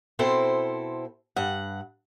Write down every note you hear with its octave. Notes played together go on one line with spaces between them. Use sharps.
B2 C4 E4 A4 C5
G2 F#5